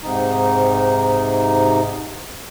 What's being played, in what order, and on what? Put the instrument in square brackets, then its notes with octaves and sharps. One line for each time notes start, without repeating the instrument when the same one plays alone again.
[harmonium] G#2 C3 D#4